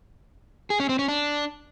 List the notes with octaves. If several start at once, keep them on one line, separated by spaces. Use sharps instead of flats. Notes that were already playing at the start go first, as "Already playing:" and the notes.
G#4
C#4
C4
C#4
D4